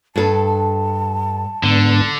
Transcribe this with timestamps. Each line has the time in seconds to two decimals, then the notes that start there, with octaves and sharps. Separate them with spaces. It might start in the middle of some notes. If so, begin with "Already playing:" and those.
0.16 G2 A4 A5
1.63 G#2 D3 B3 D4